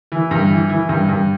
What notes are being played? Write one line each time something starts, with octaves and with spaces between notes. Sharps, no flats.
E3
G2
E3
E3
G2
G2